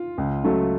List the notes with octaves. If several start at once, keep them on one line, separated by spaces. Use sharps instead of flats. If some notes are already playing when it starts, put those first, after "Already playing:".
Already playing: F4
C#2
C#3 F#3 A3